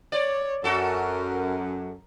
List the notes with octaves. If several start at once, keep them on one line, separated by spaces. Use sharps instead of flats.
C#5 D5
F#2 F#4 A4 A#4